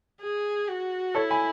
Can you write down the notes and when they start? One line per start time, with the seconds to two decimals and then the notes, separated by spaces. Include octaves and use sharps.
0.21 G#4
0.68 F#4
1.14 E4 A4 C#5
1.31 G#5 B5